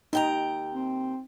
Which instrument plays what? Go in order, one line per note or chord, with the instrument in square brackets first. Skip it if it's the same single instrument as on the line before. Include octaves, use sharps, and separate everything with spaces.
[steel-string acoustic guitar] D#2 G5 A#5 [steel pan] D#4
[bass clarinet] C4